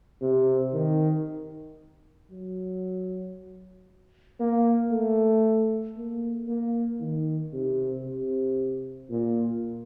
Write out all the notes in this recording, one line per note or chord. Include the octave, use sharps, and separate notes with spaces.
C3
D#3
F#3
A#3
A3
A#3
A#3
D#3
C3
C3
A#2